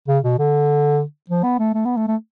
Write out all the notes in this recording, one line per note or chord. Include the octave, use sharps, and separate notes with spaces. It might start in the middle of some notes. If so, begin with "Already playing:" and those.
C#3
B2
D3
F3
B3
A3
A3
B3
A3
A3